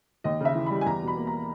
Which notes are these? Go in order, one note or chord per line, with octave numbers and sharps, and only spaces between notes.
D#2 D#5
C#3 E5
E3
G3 B5
G#5
E2 A#5
B2
B5
A#3
A#5